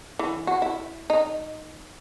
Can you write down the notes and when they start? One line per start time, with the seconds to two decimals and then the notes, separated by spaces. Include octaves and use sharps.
0.19 E3
0.47 F#4
0.62 E4
1.10 D#4